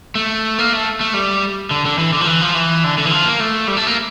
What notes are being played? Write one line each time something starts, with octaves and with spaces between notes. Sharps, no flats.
A3
A#3
A3
A3
G3
D3
D3
E3
D3
F3
E3
F3
E3
D3
D3
E3
F3
A#3
A3
G3
A3
A#3